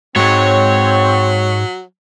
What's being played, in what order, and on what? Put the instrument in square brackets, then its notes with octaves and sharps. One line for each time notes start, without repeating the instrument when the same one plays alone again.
[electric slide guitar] G#2 G#3 [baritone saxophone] F#3 [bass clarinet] C4 [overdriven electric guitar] C#5